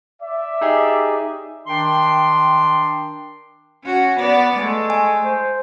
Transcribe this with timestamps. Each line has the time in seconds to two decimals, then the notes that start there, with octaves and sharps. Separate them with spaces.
0.21 D5 E5
0.61 D#4 G4 G#4
1.67 D#3 D4 G5 C6
3.84 C#4 F#4
4.19 B3 D5
4.56 G#3 A3
4.90 G#5
5.23 C5